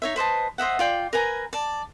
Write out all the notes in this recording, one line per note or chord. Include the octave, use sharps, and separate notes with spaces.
D#4 C#5 E5
B4 C5 D#5 A5
C5 D#5 E5 F#5
F4 D5 G5
A#4 B4 G#5 A#5
D5 A5